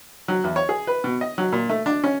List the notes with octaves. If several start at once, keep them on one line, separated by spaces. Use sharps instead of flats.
F#3
E2
C#5
G#4
B4
B2
D#5
F#3
A#2
A3
D4
C#4